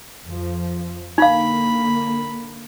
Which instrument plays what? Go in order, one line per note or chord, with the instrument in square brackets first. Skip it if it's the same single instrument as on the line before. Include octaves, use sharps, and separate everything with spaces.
[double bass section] F2 F3
[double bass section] D3 A#3 [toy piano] D#4 F5 [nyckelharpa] B5